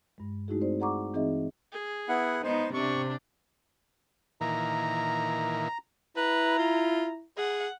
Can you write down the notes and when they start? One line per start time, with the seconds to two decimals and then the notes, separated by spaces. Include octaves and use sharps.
0.18 G2 G#3
0.48 G#3 A3 D#4 E4 F#4 G#4
0.61 C4 D#4 C5 D5
0.80 G#4 D5 F#5 A#5 C#6 D6
1.14 E3 C4 D#4 G#4 D#5 E5
1.72 G#4
2.09 B3 E4 F#5
2.43 G#3 B3 D#4 C5
2.74 C3 D4 G4 C#6
4.41 A#2 D#3 E3 A#5
6.17 E4 B4 A#5
6.58 F4
7.38 G#4 F#5